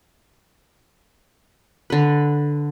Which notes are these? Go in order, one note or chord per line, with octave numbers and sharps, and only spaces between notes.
D3 B4